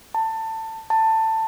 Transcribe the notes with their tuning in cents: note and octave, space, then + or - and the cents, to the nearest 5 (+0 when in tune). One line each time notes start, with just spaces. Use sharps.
A5 +20
A5 +15